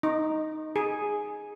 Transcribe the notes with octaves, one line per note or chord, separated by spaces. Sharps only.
D#4
G#4